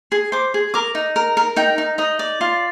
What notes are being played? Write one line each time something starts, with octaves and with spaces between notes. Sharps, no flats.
G#4
C5 D6
G#4
A#4 D6
D#4
A#4
A#4
D#4 G5
D#4
D#4 D#5
D5
F4